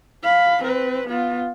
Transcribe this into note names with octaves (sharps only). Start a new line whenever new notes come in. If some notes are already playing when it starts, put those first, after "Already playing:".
F5 B5
C4 B4
B3 F4